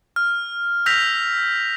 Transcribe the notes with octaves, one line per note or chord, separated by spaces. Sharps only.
F6
E6 G6 A#6 B6 F7